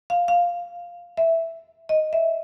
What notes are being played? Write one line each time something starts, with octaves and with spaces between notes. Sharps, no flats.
F5
F5
E5
D#5
E5